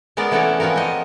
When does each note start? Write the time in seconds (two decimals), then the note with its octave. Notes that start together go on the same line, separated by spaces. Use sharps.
0.17 G#3 B3 A#4 D5
0.31 E3 A3 C#4 F#4 D5
0.60 E3 F3 C4 F#4 A#4
0.76 F#4 C5 D#5